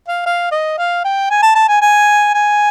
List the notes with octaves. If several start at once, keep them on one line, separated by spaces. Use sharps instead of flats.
F5
F5
D#5
F5
G5
G#5
A5
A5
G#5
G#5
G#5